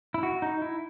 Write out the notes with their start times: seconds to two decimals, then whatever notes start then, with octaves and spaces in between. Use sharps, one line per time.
0.14 E4
0.23 F#4
0.42 D#4
0.62 E4